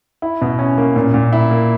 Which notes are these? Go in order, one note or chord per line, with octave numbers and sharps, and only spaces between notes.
E4
B2
C#4
A#3
A#2
A#2
E4
A#3